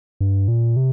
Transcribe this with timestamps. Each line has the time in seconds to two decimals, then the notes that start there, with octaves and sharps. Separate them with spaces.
0.21 G2
0.48 A#2
0.76 C3